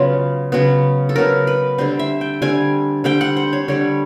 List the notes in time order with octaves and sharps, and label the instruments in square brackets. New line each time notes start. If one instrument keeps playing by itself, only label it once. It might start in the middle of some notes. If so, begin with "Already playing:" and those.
Already playing: [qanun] C#3 F#3 B3 F4
C#3 F#3 B3
A4
C#3 F#3 B3 A#4
B4
D3 G3 C4 C5
E5
G5
D3 G3 C4 G#5
D3 G3 C4 G5
F#5
C5
C#5
D3 G3 C4 C#5